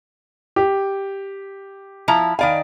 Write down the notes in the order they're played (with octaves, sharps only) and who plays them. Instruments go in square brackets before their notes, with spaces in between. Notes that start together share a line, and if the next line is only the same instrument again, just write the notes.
[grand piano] G4
[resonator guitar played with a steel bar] F3 E4 A#5
[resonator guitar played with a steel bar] D#3 D5 G#5 [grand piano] F5 B5